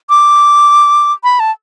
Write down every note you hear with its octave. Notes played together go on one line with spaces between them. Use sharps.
D6
B5
A5